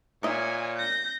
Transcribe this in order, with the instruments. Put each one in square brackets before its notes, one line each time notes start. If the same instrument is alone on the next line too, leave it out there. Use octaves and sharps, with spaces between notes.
[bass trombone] A#2 [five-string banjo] A#3 D#5 E5 [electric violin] C#5 G#5
[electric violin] G6 A#6